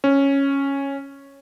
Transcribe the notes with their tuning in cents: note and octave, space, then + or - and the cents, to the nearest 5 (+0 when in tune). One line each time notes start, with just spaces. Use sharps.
C#4 -5